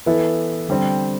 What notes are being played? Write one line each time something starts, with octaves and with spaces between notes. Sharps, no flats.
E3 B3 E4 A4
D3 G3 C4